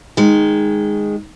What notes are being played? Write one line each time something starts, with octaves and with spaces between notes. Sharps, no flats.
D#3 G#3